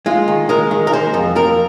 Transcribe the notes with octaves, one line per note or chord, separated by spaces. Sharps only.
G#3 F4
D#3
G#3 A#4
D#3
A#4
G#3 C5
F2
F2 A#4